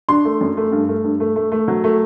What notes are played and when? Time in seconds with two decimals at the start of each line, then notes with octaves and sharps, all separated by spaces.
0.09 D4 C6
0.25 A3
0.41 F#2
0.57 A3
0.72 G2
0.89 A3
1.04 G2
1.20 A3
1.36 A3
1.52 A3
1.68 F#3
1.84 A3